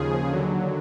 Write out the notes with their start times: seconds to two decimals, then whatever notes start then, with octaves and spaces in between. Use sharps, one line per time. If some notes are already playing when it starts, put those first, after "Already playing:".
Already playing: D#2 C#3 F3 G#4
0.28 D#2 D3 F#3